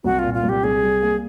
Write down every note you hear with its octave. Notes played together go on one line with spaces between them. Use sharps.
C2 F#4
A#2 F4
F4
C2
G4
C2 G#4
G3
A#3